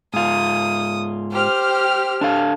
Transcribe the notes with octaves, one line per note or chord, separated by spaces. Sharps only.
G#2 F4 D#6
G4 C5 F6
D4 A4 F5